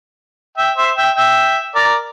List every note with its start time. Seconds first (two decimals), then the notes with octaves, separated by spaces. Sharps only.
0.57 E5 G5
0.77 C5 E5
0.96 E5 G5
1.16 E5 G5
1.75 A#4 D5